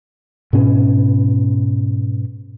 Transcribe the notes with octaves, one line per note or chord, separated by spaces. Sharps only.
G#2 B2 C#4